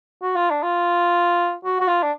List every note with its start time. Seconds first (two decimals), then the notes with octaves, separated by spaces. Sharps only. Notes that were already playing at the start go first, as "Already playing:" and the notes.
0.22 F#4
0.36 F4
0.50 D4
0.63 F4
1.65 F#4
1.80 F#4
1.88 F4
2.03 D4